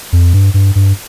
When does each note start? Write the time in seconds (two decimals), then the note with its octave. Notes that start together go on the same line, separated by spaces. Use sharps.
0.13 F2
0.33 G2
0.54 G2
0.75 G2